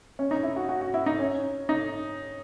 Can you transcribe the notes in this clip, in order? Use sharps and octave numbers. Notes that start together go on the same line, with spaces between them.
C#4
D#4
E4
F#4
F#4
F#4
E4
D#4
C#4
D#4